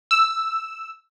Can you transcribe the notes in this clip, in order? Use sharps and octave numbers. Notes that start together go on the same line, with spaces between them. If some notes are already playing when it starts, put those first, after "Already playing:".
E6